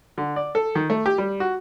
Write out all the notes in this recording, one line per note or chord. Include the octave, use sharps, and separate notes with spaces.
D3
D5
A4
D#3
A3
G4
G3
F#4